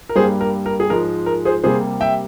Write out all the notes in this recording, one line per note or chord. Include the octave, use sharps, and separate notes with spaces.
A#4
G2 G3 A#3 G#4 C5
A#4
A#4
G#4
G#2 F3 G#3 A#4
A#4
G#4 C5
C3 G3 A#3 G#4 C5
E5 G5